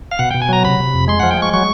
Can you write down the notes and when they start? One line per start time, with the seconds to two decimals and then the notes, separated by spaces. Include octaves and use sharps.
0.11 F5
0.19 B2 F#5
0.31 B2 G5
0.42 G#5
0.49 F#3 A#5
0.64 C3 B5
0.79 C3
0.94 F2
1.08 G#3 C6
1.20 F3 F#5
1.31 G5
1.37 G#3 C#6
1.53 F#3 C#6